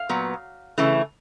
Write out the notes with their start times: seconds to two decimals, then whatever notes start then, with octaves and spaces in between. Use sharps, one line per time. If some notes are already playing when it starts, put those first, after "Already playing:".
Already playing: F5
0.09 A#2 F#3 B3
0.78 C#3 E3 A3